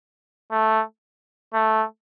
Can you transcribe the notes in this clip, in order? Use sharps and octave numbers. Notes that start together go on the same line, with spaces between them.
A3
A3